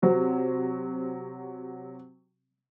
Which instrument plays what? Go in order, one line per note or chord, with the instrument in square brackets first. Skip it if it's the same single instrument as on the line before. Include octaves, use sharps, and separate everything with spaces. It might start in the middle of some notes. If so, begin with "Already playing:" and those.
[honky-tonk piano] C3 F#3 C4